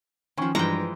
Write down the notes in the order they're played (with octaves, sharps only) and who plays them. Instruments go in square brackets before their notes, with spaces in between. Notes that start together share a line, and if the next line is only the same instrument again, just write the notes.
[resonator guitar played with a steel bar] D#3 F3 [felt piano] C#4 G#5 C#6
[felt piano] G2 [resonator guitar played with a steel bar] E3 F3 G#3 [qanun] G5 A#5